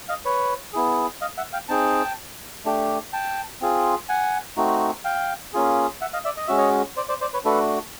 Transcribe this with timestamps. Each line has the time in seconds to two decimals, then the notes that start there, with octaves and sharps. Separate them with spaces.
0.09 D#5 F5
0.25 B4 C#5
0.73 B3 E4 G#4
1.21 D#5 F5
1.37 E5 F#5
1.53 F5 G5
1.69 C4 D#4 G#4 G5 A5
2.65 A3 D4 G4
3.13 G5 A5
3.61 C4 F4 G#4
4.09 F#5 G#5
4.57 A3 C4 D#4 F#4
5.04 F5 G5
5.53 A#3 C#4 F4 G#4
6.01 E5 F#5
6.13 D#5 F5
6.24 D5 E5
6.37 D#5
6.47 G#3 C#4 F#4 E5
6.57 C#5 D#5
6.96 C5 D5
7.09 C5 D5
7.21 C5 D5
7.33 B4 C#5
7.45 A3 D4 F#4 A4 B4